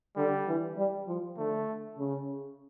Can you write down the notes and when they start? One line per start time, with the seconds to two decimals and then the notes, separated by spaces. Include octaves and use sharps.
0.16 D3 G3
0.47 E3
0.77 G3
1.07 F3
1.38 D3 A3
1.98 C#3